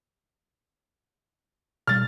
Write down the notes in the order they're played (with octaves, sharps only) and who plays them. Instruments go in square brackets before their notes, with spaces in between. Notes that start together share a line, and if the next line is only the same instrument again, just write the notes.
[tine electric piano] B2 G3 [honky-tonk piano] F6 A6